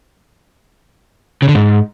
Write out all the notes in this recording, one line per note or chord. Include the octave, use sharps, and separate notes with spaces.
C#3
D3
G#2